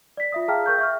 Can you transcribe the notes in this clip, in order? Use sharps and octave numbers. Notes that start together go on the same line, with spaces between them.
D5 B6
F4 E5 D#6
G#4 F5 G5 A5 A#5 F6
A#4 C#6 G6
E5 C#6 F6